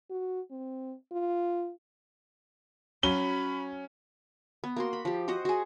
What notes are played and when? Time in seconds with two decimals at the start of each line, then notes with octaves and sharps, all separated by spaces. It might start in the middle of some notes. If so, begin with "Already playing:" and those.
0.11 F#4
0.51 C4
1.11 F4
3.03 F#3 C#4 B5 G7
4.64 B3
4.76 A#3 F#4 C6
4.93 B5
5.05 F3 G4
5.28 F#4 C5 D#5 F#5
5.45 F#4 G#4